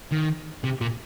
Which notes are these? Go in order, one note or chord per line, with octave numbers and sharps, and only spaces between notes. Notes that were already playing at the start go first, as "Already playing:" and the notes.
D#3
C3
A#2